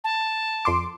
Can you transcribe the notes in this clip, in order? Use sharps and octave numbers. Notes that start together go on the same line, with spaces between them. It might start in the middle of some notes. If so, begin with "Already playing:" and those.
A5
F2 C6 D6